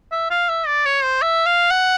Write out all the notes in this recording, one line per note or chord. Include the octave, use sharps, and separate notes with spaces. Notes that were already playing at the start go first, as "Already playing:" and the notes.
E5
F5
E5
D5
C#5
C5
E5
F5
F#5